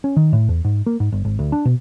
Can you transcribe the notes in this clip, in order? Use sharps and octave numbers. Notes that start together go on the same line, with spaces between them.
C#4
D#3
A2
E2
G#2
A#3
G#2
G1
G#1
D2
D4
B2